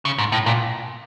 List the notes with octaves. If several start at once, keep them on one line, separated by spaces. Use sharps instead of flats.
C#3
G#2
A2
A#2